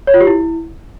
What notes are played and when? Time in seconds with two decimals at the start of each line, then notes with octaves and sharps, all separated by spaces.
0.07 C#5
0.14 F4
0.21 G4
0.27 E4